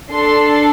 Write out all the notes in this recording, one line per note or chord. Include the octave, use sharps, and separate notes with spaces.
D4 A4 C6